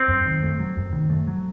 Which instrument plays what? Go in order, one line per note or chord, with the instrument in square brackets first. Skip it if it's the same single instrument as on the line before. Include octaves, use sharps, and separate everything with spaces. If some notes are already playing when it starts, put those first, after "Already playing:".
Already playing: [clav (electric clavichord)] C4
[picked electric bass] F#2
D#3
A3
F#3
F#2
D#3
A3
F#3